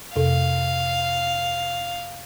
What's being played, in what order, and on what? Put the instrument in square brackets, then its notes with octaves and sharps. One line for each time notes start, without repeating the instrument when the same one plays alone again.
[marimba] F2 C3 A4 [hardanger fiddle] F5